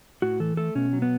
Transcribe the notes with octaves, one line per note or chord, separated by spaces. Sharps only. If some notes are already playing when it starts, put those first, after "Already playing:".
A2 F#4
E3 A4
A3 A4
B2 C#4
F#3
B3